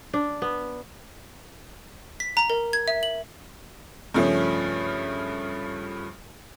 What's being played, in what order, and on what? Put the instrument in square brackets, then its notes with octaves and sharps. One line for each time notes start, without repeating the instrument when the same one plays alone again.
[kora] D4
B3
[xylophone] B6
A#5
A#4
G#6
E5
F#7
[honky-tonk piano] G2 C#3 F3 A3 C#4